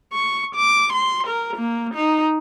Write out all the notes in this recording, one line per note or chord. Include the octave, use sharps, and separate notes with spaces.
C#6
D6
C6
A#4
A#3
D#4